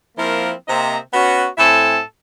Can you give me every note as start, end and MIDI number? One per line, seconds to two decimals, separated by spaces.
0.16 0.52 53
0.16 0.52 58
0.16 0.52 60
0.16 0.52 64
0.16 0.52 70
0.67 0.98 48
0.67 0.98 58
0.67 0.98 60
0.67 0.98 75
0.67 0.98 82
1.13 1.46 59
1.13 1.46 61
1.13 1.46 66
1.57 2.00 45
1.57 2.00 60
1.57 2.00 69
1.57 2.00 76
1.57 2.00 80